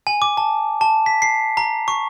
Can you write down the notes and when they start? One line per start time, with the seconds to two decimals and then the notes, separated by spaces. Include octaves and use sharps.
0.07 G#5
0.22 D6
0.37 A5
0.81 A5
1.06 B6
1.22 C7
1.57 A#5
1.88 C#6